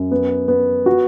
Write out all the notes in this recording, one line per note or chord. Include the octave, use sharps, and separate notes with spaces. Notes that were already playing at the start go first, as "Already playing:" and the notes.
Already playing: F#2
B3
B3
F#4